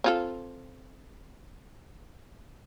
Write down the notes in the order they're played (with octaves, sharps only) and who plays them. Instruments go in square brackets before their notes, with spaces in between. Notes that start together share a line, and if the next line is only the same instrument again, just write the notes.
[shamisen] C4 F4 A4